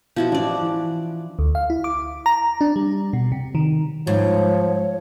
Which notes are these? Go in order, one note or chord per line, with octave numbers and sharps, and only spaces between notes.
B2 F3 E4 F#4
A1 D4 D5
E3
D2
F5
E4
D6
A#5
D4
G3
B2
C3
D#3
G#2 F3 C#5